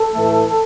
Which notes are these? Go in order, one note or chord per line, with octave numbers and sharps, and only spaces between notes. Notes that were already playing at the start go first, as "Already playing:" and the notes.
Already playing: A4
A2 E3 A3